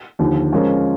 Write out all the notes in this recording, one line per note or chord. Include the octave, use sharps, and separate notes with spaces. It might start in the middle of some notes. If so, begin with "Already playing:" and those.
D#2 D3 F3
F3 G#3 C#4 F4 A#4